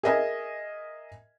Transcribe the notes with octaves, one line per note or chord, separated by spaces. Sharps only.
G#4 A#4 D#5 E5 G#5